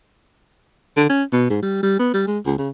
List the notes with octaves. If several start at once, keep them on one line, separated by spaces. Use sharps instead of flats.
D3
C#4
B2
G#2
G3
G3
B3
G3
G#3
C#2
C#3